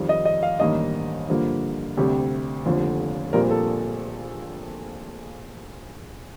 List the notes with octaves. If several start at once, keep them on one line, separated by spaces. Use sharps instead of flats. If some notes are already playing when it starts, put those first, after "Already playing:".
Already playing: F2 D#3 G3
D#5
D#5
F5
A1 G2 D#3 A#3 D#5
G2 D3 F3 A#3
D2 C3 G3 C4 G4
F1 D#2 D3 F3
A#1 A#2 G3 C4 A#4
A4